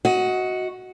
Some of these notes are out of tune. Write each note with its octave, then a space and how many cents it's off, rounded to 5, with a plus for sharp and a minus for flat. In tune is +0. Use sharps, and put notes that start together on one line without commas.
F#4 +0 D#5 +25